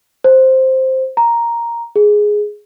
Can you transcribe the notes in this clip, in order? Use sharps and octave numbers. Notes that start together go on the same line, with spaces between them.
C5
A#5
G#4